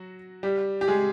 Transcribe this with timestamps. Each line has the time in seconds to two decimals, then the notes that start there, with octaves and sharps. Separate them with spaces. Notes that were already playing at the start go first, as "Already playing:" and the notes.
Already playing: F#3 F#4
0.43 G3 G4
0.81 G4
0.88 G#3 G#4